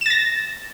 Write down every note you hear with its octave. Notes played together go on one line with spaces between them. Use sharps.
A6 A#6 E7